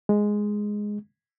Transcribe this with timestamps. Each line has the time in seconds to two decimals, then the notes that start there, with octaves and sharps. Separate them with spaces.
0.09 G#3